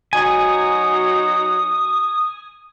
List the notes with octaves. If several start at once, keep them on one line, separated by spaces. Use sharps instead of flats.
F#3 D#4 F#4 G#5 D#6